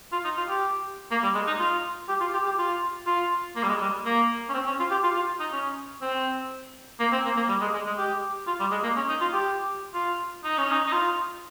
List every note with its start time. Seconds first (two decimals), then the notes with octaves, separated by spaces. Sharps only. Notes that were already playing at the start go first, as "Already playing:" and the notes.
0.12 F4
0.24 D#4
0.37 F4
0.49 G4
1.11 A#3
1.23 G3
1.34 G#3
1.47 D#4
1.59 F4
2.09 G4
2.20 F4
2.33 G4
2.45 G4
2.58 F4
3.07 F4
3.56 A#3
3.63 G3
3.69 G#3
3.81 G3
4.05 A#3
4.49 C#4
4.54 C4
4.66 C#4
4.79 F4
4.91 G4
5.03 F4
5.15 F4
5.40 D#4
5.52 C#4
6.02 C4
7.00 A#3
7.12 C4
7.25 A#3
7.36 A#3
7.49 G3
7.61 G#3
7.73 G#3
7.86 G#3
7.98 G4
8.47 F4
8.60 G3
8.71 G#3
8.83 A#3
8.97 C#4
9.09 D#4
9.21 F4
9.33 G4
9.94 F4
10.44 D#4
10.58 C#4
10.71 D#4
10.86 D#4
10.92 F4